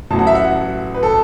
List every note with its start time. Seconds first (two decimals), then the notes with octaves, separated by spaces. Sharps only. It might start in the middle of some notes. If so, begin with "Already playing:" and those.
0.11 A1 A2 F#3 A5
0.19 F#5
0.27 E5
0.35 F#5
0.95 B4
1.03 A4